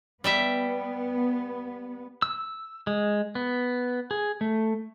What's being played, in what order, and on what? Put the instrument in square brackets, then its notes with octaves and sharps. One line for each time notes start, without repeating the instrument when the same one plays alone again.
[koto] G3 G4 E5 [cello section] B3
[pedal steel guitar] E6
G#3
B3
G#4
A3